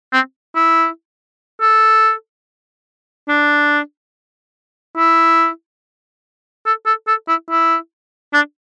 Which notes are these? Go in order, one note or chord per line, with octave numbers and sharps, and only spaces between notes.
C4
E4
A4
D4
E4
A4
A4
A4
E4
E4
D4